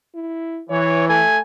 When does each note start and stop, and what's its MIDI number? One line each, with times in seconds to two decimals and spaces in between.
0.15 0.60 64
0.70 1.22 52
0.70 1.07 73
1.09 1.39 57
1.09 1.38 80